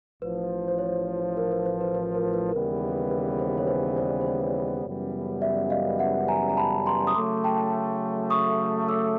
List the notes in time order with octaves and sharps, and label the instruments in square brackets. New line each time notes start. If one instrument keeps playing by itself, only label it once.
[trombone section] A1 A2 F3 [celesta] B4
[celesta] C5
C#5
A#4
B4
C5
B4
B4
A#4
B4
[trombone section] D#2 C#3 E3 G3 B3 [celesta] A#4
[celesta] B4
C5
C#5
C5
C5 D5
C5
C#5
[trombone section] F#2 C#3 E3 G3 B3
[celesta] D5 E5
D#5 F5
E5 F#5
G#5 A#5
A#5
A5 B5
A#5 C6
D#6
[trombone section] C#3 F#3 A3 [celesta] C6 D6
[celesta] G5 A5
C#6 D#6
D6 E6